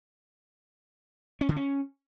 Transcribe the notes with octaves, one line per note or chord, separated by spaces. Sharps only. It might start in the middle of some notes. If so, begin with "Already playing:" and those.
C#4
D3
C#4